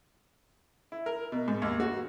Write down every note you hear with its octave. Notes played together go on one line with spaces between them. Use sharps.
E4
A#4
B2
G#2
D#2
F#4